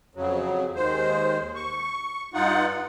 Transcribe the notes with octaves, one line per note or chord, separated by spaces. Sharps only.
F2 C#3 F#3
D#2 D#3 G#3 C5
C#6
G2 D#4 F4 F#5